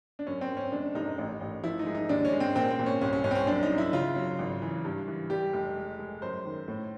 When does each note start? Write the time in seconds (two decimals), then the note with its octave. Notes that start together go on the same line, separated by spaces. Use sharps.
0.19 D4
0.27 F#2 C#4
0.41 C4
0.50 F#2
0.57 C#4
0.72 F1 D4
0.95 F1 D#4
1.18 A1
1.41 A1
1.63 F3 E4
1.79 D#4
1.86 G#3
1.95 D#4
2.09 D#2 D4
2.25 C#4
2.33 G#3
2.40 C4
2.55 A#2 C4
2.71 C4
2.79 A#2
2.86 C#4
3.01 C2 C#4
3.13 C#4
3.24 C2 C#4
3.31 C4
3.35 C#4
3.47 F#2 D4
3.63 D#4
3.70 F#2
3.78 E4
3.93 C#3 F4
4.16 F#3
4.39 G#1
4.62 E3
4.85 G2
5.07 E3
5.30 G3 G4
5.53 F1
5.76 G#3
5.99 G#3
6.22 F#2 C5
6.45 D#3
6.68 A2